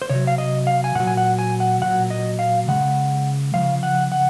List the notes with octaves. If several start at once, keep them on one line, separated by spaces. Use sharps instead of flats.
C5
C3 F#3 C#5
F5
D#5
F5
G#5
A#2 F#3 F#5
G#5
F#5
G#5
F#5
A#2 F#3 F#5
D#5
F5
C#3 G#3 F#5
C#3 F3 F5
F#5
F#5